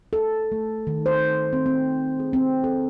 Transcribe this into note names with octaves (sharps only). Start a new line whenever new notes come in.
A4
A3
D#3
C5
C4
C4
G#4
C4
A4